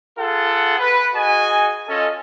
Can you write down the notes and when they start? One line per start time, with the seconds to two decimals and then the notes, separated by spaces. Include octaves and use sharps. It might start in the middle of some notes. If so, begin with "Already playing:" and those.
0.18 F4 G#4 A4 F#5
0.78 B4
1.13 F#4 G#4 D#5 G#5
1.89 C#4 F4 A4 D#5